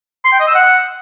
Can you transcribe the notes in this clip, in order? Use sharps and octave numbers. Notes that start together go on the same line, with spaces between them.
C6
G5
D#5
E6
F#5